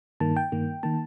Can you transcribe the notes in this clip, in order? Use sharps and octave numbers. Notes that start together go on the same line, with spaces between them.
G2 D#3 A#3 A5
G5
G2 D#3 A#3
D#3 A#3 A5